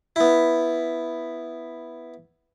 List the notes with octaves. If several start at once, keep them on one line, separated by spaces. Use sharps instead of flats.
B3 E4